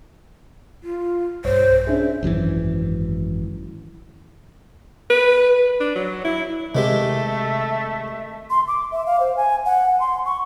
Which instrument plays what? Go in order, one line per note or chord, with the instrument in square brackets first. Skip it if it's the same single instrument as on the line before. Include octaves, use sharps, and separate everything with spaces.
[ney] F4
[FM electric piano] B1 G2 C#5 [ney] C5
[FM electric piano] C#4 D4 G#4 [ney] E5
[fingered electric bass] G#1 F#2 A2 E3
[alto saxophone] B4
D4
F#3
E4
[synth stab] C3 [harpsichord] D#3 G#3 G4 [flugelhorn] A3 [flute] E5
[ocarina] C6
D6
E5
F5
C5
G#5
F#5
C6
C#6